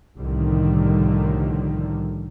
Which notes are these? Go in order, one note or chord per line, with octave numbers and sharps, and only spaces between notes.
C2 A2 D3 D#3 F3 G3